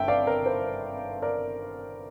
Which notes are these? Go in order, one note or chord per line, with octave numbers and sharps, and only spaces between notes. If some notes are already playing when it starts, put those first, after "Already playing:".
Already playing: G1 E5 G5 A5
D5 F5
A#4
C5
A#4 D5